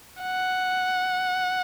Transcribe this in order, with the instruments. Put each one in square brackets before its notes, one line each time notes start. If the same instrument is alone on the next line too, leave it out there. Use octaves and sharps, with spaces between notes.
[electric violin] F#5